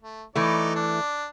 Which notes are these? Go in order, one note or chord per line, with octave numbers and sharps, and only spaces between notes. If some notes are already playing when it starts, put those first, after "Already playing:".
A3
E3 A3 D#4 D5
D4